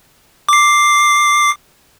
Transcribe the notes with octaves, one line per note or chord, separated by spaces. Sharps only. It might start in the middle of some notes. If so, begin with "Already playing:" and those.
D6 C7